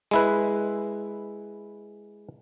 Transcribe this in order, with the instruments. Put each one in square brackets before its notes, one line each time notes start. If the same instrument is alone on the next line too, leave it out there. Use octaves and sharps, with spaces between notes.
[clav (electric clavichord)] G#3 E4 B4